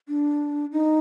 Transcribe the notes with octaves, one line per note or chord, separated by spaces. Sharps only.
D4
D#4